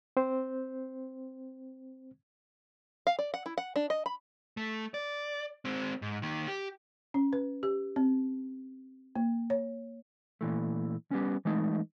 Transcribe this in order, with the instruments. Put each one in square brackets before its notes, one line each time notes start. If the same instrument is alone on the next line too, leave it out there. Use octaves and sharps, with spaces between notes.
[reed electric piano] C4 C5
[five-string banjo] F5
D5
F#5
E4
F#5
D4
D#5
B5
[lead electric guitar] A3
D5
G#3 C4
G#2
D#3 A#3
G4
[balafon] C#4
B4
G4
C4
A#3
C#5
[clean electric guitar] A#2 E3 A3
G3 B3 C#4
E3 G#3 A3 D#4